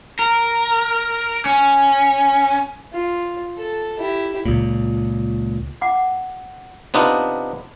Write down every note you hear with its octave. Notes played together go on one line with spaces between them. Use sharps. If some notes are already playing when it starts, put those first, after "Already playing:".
A#4
C#4
F4
A4
E4 G4
C#2 A#2
F#5 D6
C3 B3 D4 D#4 F4